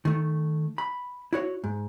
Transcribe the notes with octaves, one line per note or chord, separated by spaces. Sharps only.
D#3 A3
B5
E4 F#4 C#5
G#2